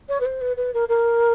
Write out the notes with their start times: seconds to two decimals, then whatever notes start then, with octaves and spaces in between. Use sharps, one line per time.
0.09 C#5
0.20 B4
0.25 C5
0.41 B4
0.57 B4
0.74 A#4
0.88 A#4